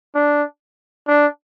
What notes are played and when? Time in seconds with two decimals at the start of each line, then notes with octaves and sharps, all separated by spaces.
0.15 D4
1.08 D4